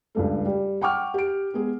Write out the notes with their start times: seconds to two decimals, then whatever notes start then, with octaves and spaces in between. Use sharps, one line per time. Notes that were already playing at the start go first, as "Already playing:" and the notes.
0.15 C#2 G2 A3
0.46 G3
0.81 F#5 G5 C#6 D6 F6
1.14 G4 D7
1.54 G#3 B3 G#4